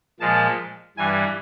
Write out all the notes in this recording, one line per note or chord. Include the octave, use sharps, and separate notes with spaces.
A#2 F3 G#3 A5
G2 E3 G3 G#5